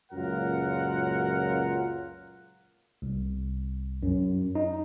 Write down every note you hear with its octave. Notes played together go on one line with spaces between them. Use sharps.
C#2 F#2 A#2 F4 A#4 F#5
C2
F#2
D#4